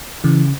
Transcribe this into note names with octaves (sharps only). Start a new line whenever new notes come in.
C#3 E3